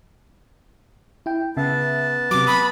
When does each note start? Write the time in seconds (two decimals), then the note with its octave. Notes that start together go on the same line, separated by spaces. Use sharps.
1.26 E4 G5
1.57 C#3 B3 E5 A5
2.31 C3 F#3 D6
2.47 B5 D#6